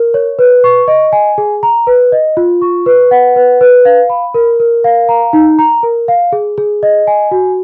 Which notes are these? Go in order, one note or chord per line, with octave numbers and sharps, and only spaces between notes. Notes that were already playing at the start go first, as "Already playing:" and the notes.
Already playing: A#4
C#5
B4
C#6
D#5
G#5
G#4
A#5
B4
D#5
F4
C#6
B4
F#5
B4
B4
F5
B5
A#4
A#4
F5
A#5
D#4
A#5
A#4
F5
G#4
G#4
D#5
G#5
F#4